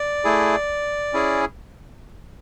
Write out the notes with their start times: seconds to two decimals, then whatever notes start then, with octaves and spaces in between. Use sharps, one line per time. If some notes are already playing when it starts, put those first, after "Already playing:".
Already playing: D5
0.24 A3 E4 G#4
1.13 C#4 E4 G#4